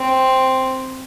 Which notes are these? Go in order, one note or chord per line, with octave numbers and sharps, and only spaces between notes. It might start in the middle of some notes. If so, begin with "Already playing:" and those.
Already playing: C4